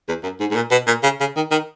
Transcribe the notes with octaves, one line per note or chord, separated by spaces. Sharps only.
E2
F#2
G#2
G#2
A#2
B2
A#2
C#3
C#3
D#3
D#3